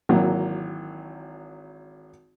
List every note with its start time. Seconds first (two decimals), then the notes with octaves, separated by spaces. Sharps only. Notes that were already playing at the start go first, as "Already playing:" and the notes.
0.09 G#1 E3 F#3 A#3